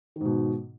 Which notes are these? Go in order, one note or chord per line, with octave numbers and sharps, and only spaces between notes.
G#2 B2 D#3